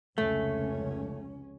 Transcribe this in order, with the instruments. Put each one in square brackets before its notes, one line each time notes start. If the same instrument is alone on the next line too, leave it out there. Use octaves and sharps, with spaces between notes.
[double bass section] F1 C#2 C#4 [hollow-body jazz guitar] A3